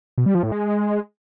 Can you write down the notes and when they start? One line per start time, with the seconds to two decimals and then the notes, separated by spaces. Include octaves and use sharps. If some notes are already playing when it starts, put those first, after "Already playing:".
0.18 B2
0.26 G3
0.35 F3
0.43 A2
0.52 G#3